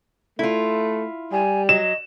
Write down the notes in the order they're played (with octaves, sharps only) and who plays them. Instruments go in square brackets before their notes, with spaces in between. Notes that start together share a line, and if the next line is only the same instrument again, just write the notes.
[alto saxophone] A3 [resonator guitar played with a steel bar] E4 F4
[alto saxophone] G3 [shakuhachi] G#5
[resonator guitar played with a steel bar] F#3 [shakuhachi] D#5 [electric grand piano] E7